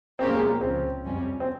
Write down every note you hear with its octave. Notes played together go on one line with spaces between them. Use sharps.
A#2 G#3 C4 C#4 G4 A#4
A#3
G#3
A#3
C#2 C#3 F3 C4
F2 C3 G3 C#4
C4